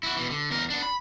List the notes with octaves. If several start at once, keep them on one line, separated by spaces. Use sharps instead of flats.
E4 F#4
B2 E3
D3
E2 A#4
B3 D4
B5